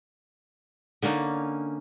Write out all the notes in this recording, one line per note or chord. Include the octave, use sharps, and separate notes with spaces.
D3 A#3 C#4 D#4